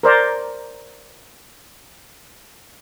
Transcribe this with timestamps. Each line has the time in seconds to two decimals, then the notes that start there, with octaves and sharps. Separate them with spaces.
0.03 A#4 C5 D5 A#5